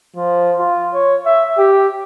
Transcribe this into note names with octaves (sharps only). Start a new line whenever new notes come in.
F3
F4
C#5
E5
G4